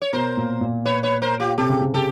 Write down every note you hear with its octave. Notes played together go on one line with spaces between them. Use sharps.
C#5
B2 A#4 C5
A#2
A#2
B4 C#5
B4 C#5
A#4 C5
F4 G4
C3 G4 A4
C#3
C3
C#3 G4 A4